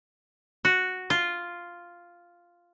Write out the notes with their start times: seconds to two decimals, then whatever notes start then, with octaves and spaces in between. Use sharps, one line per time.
0.65 F#4
1.10 F4